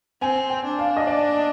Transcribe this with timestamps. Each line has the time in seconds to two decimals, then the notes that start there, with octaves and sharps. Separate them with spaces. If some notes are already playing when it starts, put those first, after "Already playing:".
0.21 C4 G#5
0.50 G5
0.65 D4
0.79 F5
0.97 D#5
1.07 D5